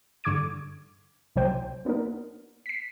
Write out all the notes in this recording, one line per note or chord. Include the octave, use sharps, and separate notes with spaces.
G2 D3 C#6 D6 G#6 D7
C2 C3 F#3 C5 G5
A#3 B3 D4 D#4 A#4
B6 C7